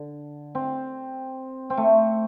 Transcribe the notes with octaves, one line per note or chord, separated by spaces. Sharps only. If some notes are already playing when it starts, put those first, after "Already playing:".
Already playing: D3
C4
C4
A3